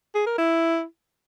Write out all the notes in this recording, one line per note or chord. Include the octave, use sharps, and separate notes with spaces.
G#4
A#4
E4